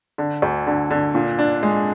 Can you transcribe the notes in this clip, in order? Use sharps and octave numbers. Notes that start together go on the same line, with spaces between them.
D3
D2
D3
D3
A#2
D4
G#3